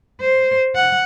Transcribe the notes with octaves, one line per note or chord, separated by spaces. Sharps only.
C5
F#5